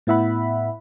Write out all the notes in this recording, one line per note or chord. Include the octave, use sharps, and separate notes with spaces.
A2 B3 E4 E5 F#5 B5